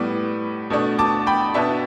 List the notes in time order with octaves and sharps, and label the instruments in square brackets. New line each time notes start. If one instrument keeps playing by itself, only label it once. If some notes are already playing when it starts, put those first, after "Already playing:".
Already playing: [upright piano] A2 G3 B3 D6
B2 A3 D4
A5 D6
G5 B5
B2 B3 D4 E5 A5